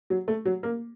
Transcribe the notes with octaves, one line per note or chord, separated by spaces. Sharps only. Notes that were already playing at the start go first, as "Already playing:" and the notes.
F#3
A3
F#3
A#3